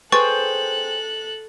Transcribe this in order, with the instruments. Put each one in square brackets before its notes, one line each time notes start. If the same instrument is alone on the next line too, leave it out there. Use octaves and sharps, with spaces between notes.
[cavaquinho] G#4 C5 G5 [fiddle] A4 F#6 [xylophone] B4 C#6 A6